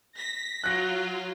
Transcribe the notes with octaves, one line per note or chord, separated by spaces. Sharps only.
A#6 B6
F#3 F4 F#6 A#6